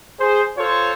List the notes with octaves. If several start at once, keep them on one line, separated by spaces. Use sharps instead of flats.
G#4 C5
F4 A4 C5 C#5